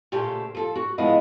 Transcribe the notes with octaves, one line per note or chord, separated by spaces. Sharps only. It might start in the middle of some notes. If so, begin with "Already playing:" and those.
A#2 C#3 A3 G4 C5 A5
F3 A4
F#4
F3 G#3 B3 E4 D#5 F5